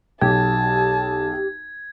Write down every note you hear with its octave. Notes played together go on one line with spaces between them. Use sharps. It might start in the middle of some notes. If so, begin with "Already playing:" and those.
B1 G4 A5 G#6